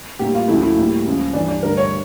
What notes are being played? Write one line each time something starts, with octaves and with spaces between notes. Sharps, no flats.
A2 G3 A#3 G4
F4
D2 C#3 F3 A3 E4
E4
A2 G3 A#3
C#2 C#3 F3
G2 E3 G3 D4
D4
G2 D3 A3 A#4
C#5